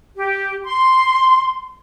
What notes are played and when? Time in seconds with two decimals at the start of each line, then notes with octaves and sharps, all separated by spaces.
0.15 G4
0.66 C6